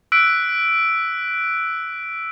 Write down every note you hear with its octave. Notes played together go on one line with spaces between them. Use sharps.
E6 F#6 B6 D7